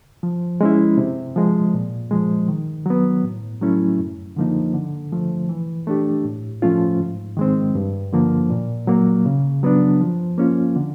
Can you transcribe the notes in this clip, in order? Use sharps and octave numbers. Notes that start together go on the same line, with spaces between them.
F3
G#3 C#4 E4
C3
F3 G#3
A#2
F3 G#3
D#3
F#3 B3
A2
F#3 A3 C#4 E4
F#2
D3 F3 A#3 D#4
D3
F3 A3
E3
A3 D4 G4
A2
F3 A3 C#4 F4
G#2
D#3 G#3 C4
G2
D3 F3 A#3
A#2
F#3 A#3
C#3
F#3 B3 D4
F3
A#3 C#4 F4
D3